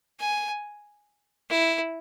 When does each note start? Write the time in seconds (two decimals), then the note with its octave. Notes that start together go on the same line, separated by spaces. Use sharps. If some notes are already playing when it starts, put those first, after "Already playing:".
0.20 G#5
1.50 E4